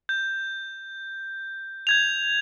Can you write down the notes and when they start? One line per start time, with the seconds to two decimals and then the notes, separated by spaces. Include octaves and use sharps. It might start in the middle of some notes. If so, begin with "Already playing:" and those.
0.09 G6
1.87 G6 G#6 F7